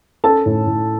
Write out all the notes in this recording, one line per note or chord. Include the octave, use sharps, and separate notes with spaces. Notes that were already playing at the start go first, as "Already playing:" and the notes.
C#4 A4 A5
A2
A2